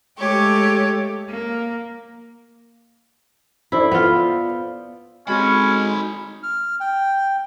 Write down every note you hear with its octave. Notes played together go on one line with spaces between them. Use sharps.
G#3 A3 G4 C#5
A#3
E4 A4 C5 D5
B3 F4
G#3 C4 C#4 D#4 F#4 A4 B5
F6
G5